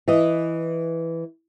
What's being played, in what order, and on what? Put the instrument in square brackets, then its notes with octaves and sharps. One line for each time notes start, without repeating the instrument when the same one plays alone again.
[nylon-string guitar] E3 D#5